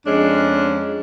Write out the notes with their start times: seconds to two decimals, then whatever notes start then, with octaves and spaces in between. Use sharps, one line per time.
0.05 F2 G#3 C#4 D4